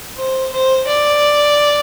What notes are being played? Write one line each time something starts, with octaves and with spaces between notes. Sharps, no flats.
C5
C5
D5